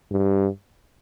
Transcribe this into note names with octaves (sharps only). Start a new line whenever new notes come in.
G2